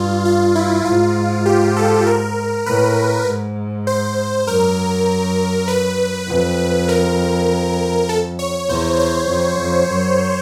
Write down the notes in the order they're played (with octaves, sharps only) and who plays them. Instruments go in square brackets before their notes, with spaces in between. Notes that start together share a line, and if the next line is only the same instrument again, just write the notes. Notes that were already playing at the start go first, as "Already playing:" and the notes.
Already playing: [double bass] G2 [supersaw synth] F4
[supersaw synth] F4
E4
[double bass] G#2 [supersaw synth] F4
[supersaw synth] G4
A4
A#4
[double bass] A2 [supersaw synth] B4
[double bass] G#2
[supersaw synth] C5
[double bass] F#2 [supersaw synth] A#4
[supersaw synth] B4
[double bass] F2
[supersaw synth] A#4
A4
C#5
[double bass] E2 [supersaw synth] C5
[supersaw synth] C5
[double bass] F2
F2
F#2